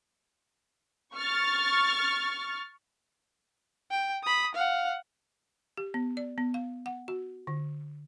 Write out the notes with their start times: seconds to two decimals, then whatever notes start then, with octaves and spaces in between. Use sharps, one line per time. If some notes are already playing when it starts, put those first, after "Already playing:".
1.15 C#6 F6 A6
3.91 G5
4.24 B5 D#6
4.54 F5 F#5
5.77 G4
5.94 B3
6.17 D5
6.38 B3
6.54 F5
6.86 F#5
7.08 F#4
7.47 D3